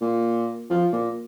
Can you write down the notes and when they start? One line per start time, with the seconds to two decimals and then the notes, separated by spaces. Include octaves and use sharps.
0.01 A#2
0.70 F3
0.93 A#2